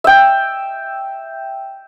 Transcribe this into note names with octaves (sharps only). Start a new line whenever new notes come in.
E5 G5